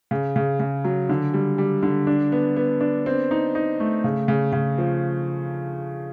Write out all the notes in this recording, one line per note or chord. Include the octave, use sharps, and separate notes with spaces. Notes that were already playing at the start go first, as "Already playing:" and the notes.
C#3
C#3
C#3
F#3
D3
G3
G3
D3
D4
B3
B3
D4
C4
D#4
D#4
A3
C#3
C#3
C#3
F3